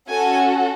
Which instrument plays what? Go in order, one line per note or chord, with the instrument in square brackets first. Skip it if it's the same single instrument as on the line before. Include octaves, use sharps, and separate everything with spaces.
[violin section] C#4 F#4 A4 G#5